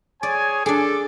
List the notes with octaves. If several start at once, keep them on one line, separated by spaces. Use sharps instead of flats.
G#4 C#5 D5 G#5
D4 G#4 A4 D6